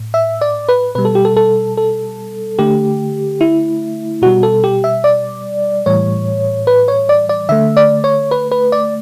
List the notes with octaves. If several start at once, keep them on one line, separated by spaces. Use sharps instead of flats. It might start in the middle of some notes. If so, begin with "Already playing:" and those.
Already playing: A2
E5
D5
B4
B2 G3 B4
A4
G4
A4
A4
A4
D3 A3 G4
E4
B2 G3 F#4
A4
G4
E5
D5
A2 E3 G3 C#5
B4
C#5
D5
D5
D3 A3 E5
D5
C#5
B4
B4
D5